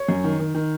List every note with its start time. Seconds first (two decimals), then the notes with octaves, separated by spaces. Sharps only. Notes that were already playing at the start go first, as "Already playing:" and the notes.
Already playing: C#5
0.09 F#2
0.24 D#3
0.39 D#3
0.55 D#3